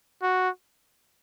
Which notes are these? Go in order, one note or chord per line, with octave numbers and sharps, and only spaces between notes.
F#4